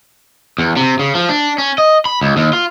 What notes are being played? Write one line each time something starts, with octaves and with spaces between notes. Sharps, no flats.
E2
C3
C#3
F3
D4
C#4
D#5
B5
C#2
D#2
F4